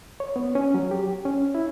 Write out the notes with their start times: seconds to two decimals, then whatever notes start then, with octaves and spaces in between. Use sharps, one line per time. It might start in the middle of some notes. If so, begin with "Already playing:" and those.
0.20 C#5
0.36 B3
0.55 C#4
0.74 F#3
0.91 G4
1.25 C#4
1.55 E4